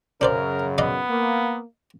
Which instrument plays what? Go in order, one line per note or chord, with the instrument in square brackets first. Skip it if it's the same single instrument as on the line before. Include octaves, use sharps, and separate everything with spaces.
[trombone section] F#2 C#3 [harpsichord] D4 C5 D5 [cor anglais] A#4
[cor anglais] B3 [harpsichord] D5 D#5 F5
[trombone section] A#3